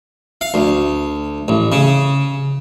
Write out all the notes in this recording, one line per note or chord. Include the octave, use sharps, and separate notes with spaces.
F5
D2
A1
C#3